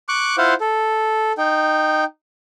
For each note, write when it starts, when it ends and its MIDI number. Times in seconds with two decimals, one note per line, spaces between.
0.09 0.36 85
0.09 0.36 86
0.09 0.36 90
0.38 0.54 64
0.38 0.54 65
0.38 0.54 72
0.38 0.54 77
0.38 0.54 78
0.61 1.32 69
1.38 2.04 63
1.38 2.04 79